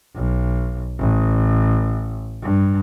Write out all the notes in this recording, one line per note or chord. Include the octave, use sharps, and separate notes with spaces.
B1
A1
G2